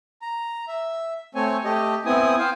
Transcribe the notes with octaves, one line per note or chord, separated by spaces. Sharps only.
A#5
E5
A3 C4 C#5 G#5
A3 G4 D#5
B3 C4 E4 G#5 D#6
C5 F5 G5